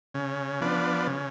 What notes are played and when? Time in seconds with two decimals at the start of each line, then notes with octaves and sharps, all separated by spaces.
0.14 C#3
0.61 F3 B3 D4
1.07 C#3